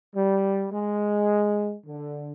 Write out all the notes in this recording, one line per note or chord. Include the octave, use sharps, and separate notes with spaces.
G3
G#3
D3